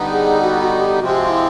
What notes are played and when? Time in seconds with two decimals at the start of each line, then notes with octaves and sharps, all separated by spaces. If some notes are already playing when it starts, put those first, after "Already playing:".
Already playing: D3 G3 B3 D#4
0.12 G#4
0.42 F#4
0.61 F#4
0.81 G4
1.00 C3 F3 G#3 C4 F#4
1.09 G4
1.19 F#4
1.29 E4